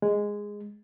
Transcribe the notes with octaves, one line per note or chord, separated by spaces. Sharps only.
G#3